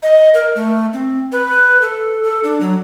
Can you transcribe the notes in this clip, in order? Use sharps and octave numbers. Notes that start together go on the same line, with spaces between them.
D#5
A#4
A3
C4
B4
A4
A4
D4
F#3